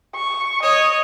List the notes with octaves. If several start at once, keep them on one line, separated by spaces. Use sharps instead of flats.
C#6
C#5 D#5